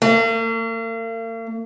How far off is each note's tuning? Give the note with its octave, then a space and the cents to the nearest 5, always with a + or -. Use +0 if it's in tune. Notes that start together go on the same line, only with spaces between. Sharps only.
A#3 -45